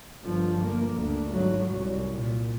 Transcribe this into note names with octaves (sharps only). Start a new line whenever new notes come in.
G1 F3
A#3
D2
G#1 F#3
C2
A#2